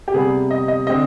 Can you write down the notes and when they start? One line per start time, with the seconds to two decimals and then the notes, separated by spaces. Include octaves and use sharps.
0.08 G4
0.13 C3 G3 B3 G#4
0.51 D#5
0.68 D#5
0.87 D3 G#3 C4 D#5